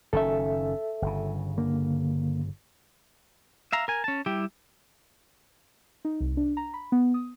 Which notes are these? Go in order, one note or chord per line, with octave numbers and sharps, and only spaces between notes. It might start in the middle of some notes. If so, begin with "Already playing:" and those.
F#1 D#3 C#4 A4 E5
G1 C#3
D3 A#3
E5 F5 A#5
A#4 G#5
C#4 A5
G3 E4 G4
D#4
C2
D4
A#5
B5
B3
D#6